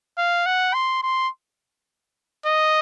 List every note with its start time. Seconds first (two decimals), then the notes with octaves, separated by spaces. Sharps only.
0.18 F5
0.46 F#5
0.74 C6
1.03 C6
2.46 D#5